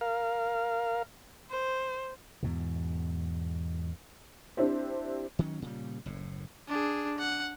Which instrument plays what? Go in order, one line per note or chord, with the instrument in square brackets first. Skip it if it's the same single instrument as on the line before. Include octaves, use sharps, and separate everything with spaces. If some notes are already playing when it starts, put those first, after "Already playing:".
[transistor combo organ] A#4 F5
[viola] C5
[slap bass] E2 G#2 B2
[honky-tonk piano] C4 D4 E4 G4 C5
[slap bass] D#3 F#3 C#4
A#2 C#3 G3
F#1 A2
[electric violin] D4 G#4
F#5